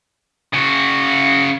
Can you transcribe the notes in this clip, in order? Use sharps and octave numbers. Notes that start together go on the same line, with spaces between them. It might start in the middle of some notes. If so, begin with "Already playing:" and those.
C#3 F#4